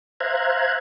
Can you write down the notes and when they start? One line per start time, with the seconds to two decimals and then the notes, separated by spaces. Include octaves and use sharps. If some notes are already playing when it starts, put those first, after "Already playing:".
0.20 C5 E5 F5 A#5 F#6 G#6